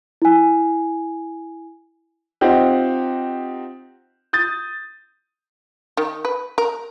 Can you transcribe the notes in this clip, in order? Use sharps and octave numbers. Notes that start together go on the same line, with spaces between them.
E4 G#5
C4 D#4 F4 G4 C5 F#5
D#6 G6 A6
D#3
B4
A#4